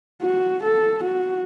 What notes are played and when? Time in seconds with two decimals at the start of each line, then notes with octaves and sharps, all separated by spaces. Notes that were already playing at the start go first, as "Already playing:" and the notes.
0.22 F#4
0.64 A4
1.04 F#4